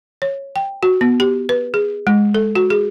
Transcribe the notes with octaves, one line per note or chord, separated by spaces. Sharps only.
C#5
G5
F#4
B3
G4
B4
G#4
G#3
A4
F#4
G#4